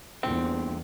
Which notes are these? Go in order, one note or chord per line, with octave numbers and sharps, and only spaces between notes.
E2 G2 A#2 D3 C4